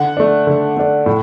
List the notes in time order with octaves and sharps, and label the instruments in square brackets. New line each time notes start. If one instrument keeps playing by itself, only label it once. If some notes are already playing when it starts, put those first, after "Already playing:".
Already playing: [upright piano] D3 F#5
A3 D4
D3
A3 D4
A2